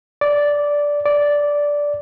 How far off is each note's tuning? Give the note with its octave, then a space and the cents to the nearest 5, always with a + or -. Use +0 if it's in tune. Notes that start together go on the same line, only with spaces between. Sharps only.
D5 -10
D5 -10